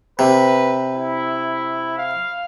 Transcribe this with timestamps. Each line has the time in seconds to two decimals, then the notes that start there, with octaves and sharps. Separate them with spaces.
0.19 C3 B4
0.93 E4
1.98 F5